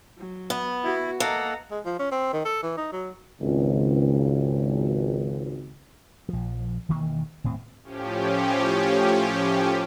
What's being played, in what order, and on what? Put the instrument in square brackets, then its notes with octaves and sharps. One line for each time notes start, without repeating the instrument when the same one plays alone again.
[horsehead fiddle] F#3
[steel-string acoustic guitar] B3
[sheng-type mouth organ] E4 [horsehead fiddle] F#4
[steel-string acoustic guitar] A#3 [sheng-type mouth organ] A4 F#5 [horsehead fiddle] D#5 A#5
[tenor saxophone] G#3
F3
C#4
C4
D#3
A4
E3
D#4
F#3
[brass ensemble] G#1 C#2
[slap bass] A#1 F3
E1 D#3 E3 A#3
D#1 A2 C4
[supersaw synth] A2 F3 C#4 G4